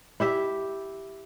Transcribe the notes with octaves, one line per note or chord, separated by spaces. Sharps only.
E4 G4 E5